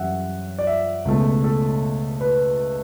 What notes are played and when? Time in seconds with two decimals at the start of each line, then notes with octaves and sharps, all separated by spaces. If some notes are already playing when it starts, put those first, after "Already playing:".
Already playing: F#2 E3 G3 E5 F#5
0.59 D5
0.67 E5
1.05 C#2 B2 A3
1.44 A4
2.21 B4